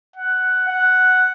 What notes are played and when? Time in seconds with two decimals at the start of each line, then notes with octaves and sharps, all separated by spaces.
0.16 F#5
0.68 F#5